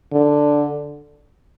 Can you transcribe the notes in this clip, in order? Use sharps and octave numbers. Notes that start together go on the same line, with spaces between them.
D3